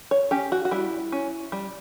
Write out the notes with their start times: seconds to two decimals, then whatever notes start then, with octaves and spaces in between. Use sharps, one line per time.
0.11 C#5
0.31 C#4 G4
0.52 F#4
0.65 F#4
0.71 G3 E4
1.12 C#4
1.52 G3